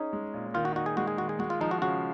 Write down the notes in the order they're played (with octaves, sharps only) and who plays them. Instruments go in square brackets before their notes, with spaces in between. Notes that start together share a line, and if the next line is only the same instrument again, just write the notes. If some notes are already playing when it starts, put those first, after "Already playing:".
Already playing: [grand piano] C#4 G#4 [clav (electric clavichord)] D#4
[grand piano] G#3
A#2
[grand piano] D#3 [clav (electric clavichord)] F4
[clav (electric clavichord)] F#4
[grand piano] D#4 [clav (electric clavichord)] F#4
[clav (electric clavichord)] G#4
[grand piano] G#3 [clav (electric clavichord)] F#4
[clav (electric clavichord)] G#4
[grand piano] D#3 [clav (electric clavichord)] F#4
[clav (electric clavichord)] G#4
[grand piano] G#3 [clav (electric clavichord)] F#4
[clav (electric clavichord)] F4
[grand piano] F3 [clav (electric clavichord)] D#4
[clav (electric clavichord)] F#4
[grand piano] C#3 [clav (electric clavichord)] F#4